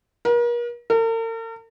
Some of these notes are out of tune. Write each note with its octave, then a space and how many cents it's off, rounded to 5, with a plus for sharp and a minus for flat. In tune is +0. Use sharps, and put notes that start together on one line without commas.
A#4 +40
A#4 -45